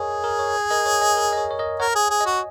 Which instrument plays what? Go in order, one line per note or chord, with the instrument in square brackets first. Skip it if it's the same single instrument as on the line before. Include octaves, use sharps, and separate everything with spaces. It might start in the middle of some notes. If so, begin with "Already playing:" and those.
Already playing: [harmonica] G#4 [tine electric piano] A#4 C#5 D#5
[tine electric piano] A#4
C#5
A#4 D#5
C#5
D#5 G#5
A#4
D#5
C#5
C#5
A#4 D#5
[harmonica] A#4 [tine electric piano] C#5 F#5
[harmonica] G#4
G#4
[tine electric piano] D#5 G#5
[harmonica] F#4